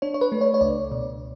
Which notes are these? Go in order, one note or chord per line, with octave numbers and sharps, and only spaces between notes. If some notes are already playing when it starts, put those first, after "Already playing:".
D4 C#5
C#5
B4
A3
C#5
C#5
C#2 D5
B2